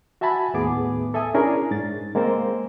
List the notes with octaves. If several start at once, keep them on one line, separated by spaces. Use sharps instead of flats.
F#4 E5 G#5 A5 B5
D#2 A2 B3 G#4 D6
A4 E5 G#5 D#6
C#4 D4 E4 G#4 A#4
G#2 A6
G#3 A#3 C4 A#4 C5